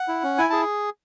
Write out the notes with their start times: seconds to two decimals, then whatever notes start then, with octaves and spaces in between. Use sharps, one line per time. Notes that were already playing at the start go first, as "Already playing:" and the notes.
Already playing: F#5
0.08 E4
0.23 C#4
0.38 E4 G#5
0.50 G#4 A5